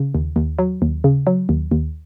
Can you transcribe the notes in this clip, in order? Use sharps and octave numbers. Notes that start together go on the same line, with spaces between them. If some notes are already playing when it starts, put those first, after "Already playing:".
Already playing: C#3
D#2
D#2
F#3
D#2
C#3
F#3
D#2
D#2